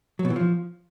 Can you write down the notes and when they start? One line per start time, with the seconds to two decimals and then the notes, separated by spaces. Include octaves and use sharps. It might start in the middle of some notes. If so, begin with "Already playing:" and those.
0.19 F#3
0.25 B2
0.30 E3
0.36 F3